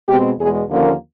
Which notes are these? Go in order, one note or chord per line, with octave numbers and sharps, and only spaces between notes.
B2 G#3 C4 G4
E2 B2 G#3 G#4
D#2 D3 F3 A#3 C#4